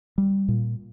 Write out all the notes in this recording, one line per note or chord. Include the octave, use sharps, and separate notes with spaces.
G3
A#2